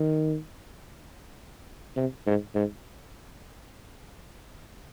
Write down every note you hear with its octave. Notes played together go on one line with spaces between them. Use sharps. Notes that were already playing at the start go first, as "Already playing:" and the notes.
Already playing: D#3
C3
G#2
G#2